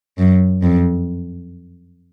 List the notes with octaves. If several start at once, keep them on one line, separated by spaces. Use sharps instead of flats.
F#2
F2